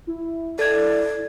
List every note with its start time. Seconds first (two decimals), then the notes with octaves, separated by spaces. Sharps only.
0.07 E4
0.59 A4 D5 G#6